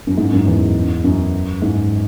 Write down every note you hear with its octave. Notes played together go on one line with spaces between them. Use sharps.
F#2
G#2
F#2
E2
F#2
G#2